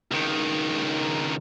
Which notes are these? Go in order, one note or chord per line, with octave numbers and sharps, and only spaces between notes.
C#2 D#3